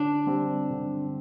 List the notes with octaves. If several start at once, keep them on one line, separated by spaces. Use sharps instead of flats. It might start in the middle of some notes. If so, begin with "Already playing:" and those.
Already playing: D3 D4
G3 C4 G4
D3